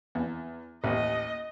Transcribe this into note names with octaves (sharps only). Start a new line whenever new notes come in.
E2
A1 D#2 D#5